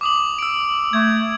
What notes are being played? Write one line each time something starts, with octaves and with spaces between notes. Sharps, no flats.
D6 D#6 F#7
E6 D7
A3 G#6